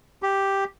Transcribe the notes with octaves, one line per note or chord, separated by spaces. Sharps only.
G4